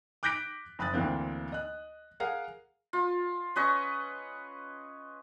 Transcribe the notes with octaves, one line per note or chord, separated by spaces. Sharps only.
D6 F#6 G6 A#6 B6 D7
F#1 B5 D#6 F#6 A6
D2 E3 A#3 C4
D#5 F#6
G#4 A#4 F5 F#5
F4
C#4 B4 D#5 C#6